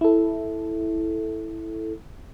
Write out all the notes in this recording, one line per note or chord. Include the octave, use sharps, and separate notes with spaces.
E4 A4